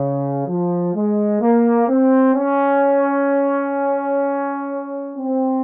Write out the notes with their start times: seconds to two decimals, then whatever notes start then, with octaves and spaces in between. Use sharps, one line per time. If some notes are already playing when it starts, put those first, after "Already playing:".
Already playing: C#3
0.48 F3
0.95 G#3
1.41 A#3
1.88 C4
2.35 C#4
5.17 C4